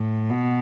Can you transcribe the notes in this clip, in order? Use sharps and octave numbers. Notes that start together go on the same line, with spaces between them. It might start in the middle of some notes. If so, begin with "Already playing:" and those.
Already playing: A2
B2